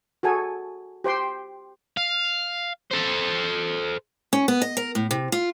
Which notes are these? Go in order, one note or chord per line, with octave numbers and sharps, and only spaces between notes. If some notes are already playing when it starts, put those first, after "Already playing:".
F#4 G#4 A4 G#5
G4 C5 G5 C6
F5
A4 C5
C#4
B3
D#5
A#4
A2
C3
F4